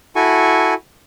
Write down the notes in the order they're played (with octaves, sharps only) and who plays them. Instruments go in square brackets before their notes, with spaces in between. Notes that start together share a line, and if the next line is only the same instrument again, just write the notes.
[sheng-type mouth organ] E4 F#4 A4 G#5 C#6